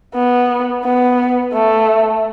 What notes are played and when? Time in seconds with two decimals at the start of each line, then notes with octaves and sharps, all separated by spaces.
0.15 B3
0.84 B3
1.54 A3